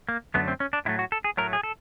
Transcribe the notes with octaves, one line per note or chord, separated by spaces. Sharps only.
A#3
F#2 D3 F#3 A3 B3
C4
C#4
D4
A2 F#3 A3 E4
F#4
A4
G#4
A2 F#3 A3 A#4
G#4
A4